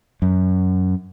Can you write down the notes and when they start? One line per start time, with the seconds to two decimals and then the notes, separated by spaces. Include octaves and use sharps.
0.22 F#2